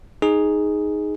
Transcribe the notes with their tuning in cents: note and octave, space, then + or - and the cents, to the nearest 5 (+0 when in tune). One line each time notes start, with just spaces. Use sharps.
D#4 +0 G#4 +0